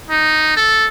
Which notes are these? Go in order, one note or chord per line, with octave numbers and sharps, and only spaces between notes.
D#4
A4